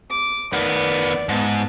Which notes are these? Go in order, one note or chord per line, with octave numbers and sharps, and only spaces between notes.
D6
D#3 B3 D5
G#2 B3 A5